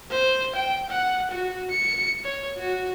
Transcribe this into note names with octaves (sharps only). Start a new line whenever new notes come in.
C5
G5
F#5
F#4
C#7
C#5
F#4